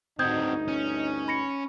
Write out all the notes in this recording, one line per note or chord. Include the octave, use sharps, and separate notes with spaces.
D2 G2 C4 D#4 F#4 D#6 G6 G#6
C#4
B5 A#6 C#7